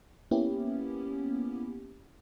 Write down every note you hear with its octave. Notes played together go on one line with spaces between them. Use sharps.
A#3 B3 C#4 E4 G4